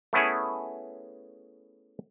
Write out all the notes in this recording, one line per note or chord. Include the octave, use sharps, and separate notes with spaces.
A3 B3 C#4 E4 G#4